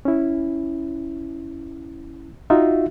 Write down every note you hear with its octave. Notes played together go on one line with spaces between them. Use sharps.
C#4 E4
D#4 F4 F#4 E5